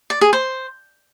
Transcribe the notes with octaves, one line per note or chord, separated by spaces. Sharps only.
D5
G#4
C5